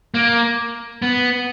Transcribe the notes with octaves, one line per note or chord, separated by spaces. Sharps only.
A#3
B3